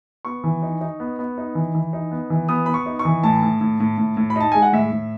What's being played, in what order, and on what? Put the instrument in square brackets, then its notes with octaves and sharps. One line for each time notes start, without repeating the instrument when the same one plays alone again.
[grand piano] B3 C#6
E3
D#4
D#4
B3
B3
D#4
E3
E3
D#4
B3
E3
B3 D#6
B3 B5
C#6
D#4
C#6
E3
A2 A5
A2
A2
A2
A2
A2
B5
D#4 A5
G#3 G#5
F#5
A2 E5
A2